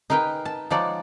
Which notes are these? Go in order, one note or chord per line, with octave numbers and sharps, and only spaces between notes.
D#4 G#4 A#4 B4 G5
A5
F3 G#3 D#4 C#5 D5 F#5